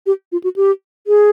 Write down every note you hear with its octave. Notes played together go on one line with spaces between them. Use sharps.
G4
F4
F#4
G4
G#4